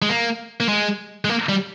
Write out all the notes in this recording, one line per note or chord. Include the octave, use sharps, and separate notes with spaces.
G#3
A#3
A#3
G#3
G#3
A#3
G3